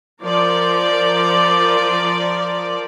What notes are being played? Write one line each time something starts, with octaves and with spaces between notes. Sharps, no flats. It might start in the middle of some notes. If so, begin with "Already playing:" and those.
F3 A#4 D5